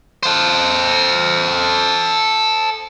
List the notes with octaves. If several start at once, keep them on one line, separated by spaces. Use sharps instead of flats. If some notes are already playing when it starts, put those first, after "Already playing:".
A4 C5